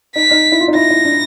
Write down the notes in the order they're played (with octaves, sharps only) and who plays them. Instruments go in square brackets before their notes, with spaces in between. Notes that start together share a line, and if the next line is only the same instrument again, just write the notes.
[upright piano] D#4 [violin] B6
[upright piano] D#4
E4
F4
D#4
[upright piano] E4 [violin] A#6
[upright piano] E4
D4